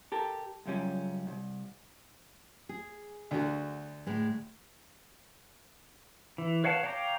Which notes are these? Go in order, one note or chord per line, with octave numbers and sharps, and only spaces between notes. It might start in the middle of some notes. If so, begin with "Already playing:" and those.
G4 A4 A#4
C#2 F#2 G3 C#4
C2
G#4
D2 D3 F#4
A2 G#3
E3
B4 C#5 F5 F#5 A5
C#5 F5 G5 A#5 D6